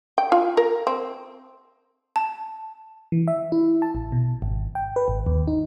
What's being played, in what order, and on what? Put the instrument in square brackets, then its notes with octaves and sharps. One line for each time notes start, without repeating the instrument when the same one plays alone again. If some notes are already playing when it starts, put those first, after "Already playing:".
[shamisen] G5
F4
A#4
C4
[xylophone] A5
[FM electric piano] E3
E5
E4
A5
A1
B2
G#1
G5
B4
G#1
D#2
D#4